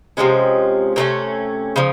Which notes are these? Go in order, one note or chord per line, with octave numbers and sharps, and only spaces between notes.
C3 F3 G#3 C#4
C3 E3 A3 C#4
C#3 F3